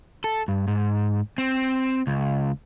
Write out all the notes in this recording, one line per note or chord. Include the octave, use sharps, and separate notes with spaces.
A4
G2
G#2
C4
C#2